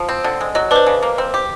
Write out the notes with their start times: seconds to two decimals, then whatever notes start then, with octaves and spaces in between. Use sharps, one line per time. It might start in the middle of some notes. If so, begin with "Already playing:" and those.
Already playing: F3
0.09 C4
0.24 D3
0.41 G#3
0.55 F#3 D#5
0.71 D4 B4 C5
0.87 C#3
1.03 A#3
1.18 C4
1.34 G4